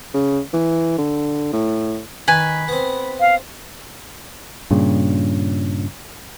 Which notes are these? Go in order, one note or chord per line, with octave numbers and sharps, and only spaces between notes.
C#3
E3
D3
A2
D#3 B4 G#5
B3 C4
F5
G2 A#2 C#3